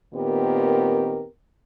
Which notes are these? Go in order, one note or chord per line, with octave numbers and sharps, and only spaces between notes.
A#2 D#3 B3 C4 G4 A#4